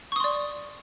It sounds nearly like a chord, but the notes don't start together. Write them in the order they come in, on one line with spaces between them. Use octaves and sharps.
C#6 D#6 C6 D5